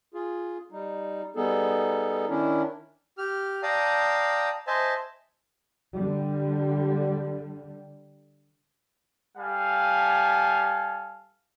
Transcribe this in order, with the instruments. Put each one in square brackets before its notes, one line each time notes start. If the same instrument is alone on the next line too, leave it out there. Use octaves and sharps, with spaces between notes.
[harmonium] F4 G#4
G3 D#4
G3 B3 D#4 G#4 A4
D#3 C#4 D4 E4
[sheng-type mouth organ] G4 F6
D5 F5 G5 A5 A#5 D#6
C5 D#5 E5 G#5 A5
[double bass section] D3 G3
[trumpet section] G3 A4 F5 G#5